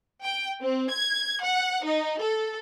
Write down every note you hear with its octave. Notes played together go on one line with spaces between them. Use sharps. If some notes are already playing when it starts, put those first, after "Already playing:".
G5
C4
G#6
F#5
D#4
A4